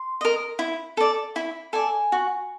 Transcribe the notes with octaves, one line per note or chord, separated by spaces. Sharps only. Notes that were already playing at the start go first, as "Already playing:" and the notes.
Already playing: C6
A#4 D#5
E4
A4 D5
E4 B5
A4 D5 G#5
F#4